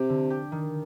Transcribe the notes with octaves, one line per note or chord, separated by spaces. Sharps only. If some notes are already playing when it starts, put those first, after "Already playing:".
Already playing: C3 G4
D3
G4
D#3